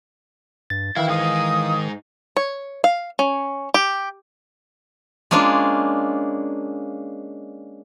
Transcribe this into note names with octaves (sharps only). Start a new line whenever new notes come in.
G2 A6
D#3 E3 E4 F5 G5
G#2 D#4 D#6
C#5
F5
C#4
G4
G#3 A#3 C#4 D4 F4